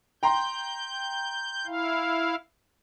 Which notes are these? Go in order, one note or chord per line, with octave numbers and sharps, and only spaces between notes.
G5 A#5 C6 G6
E4 F5